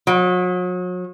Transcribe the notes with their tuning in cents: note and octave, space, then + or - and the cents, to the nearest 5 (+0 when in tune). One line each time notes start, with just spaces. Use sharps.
F#3 -40